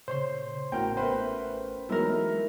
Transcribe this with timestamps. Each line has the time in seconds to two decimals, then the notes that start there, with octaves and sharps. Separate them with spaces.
0.08 A#2 C#3 C5 C#5 C6
0.72 A1 A2 C#4 F#4 A#4 G5 F6
0.97 A3 B4 C5
1.89 E3 F#3 G#3 A3 D#4 E4 A#4